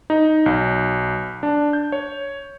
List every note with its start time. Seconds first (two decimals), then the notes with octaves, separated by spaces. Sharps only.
0.10 D#4
0.46 B1
1.43 D4
1.73 G6
1.92 C#5